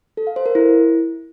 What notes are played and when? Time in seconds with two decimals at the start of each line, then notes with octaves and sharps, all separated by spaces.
0.17 A4
0.27 F5
0.36 C5
0.46 A#4
0.55 E4